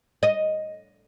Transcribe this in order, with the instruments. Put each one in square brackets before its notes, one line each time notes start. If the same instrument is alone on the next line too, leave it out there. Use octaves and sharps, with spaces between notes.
[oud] D#5